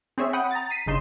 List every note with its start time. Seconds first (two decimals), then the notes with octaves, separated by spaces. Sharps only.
0.18 C4 G#4 C#5 E5
0.33 F#5 G5 B5 D#6
0.51 A#5 A6
0.70 B6 C7 D#7
0.86 G1 C#3 D#4 C6 E7